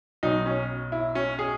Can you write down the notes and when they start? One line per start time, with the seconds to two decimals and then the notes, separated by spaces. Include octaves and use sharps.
0.23 B1 B2 F#3 D#4
0.46 C#4
0.92 E4
1.15 C#4
1.39 G#4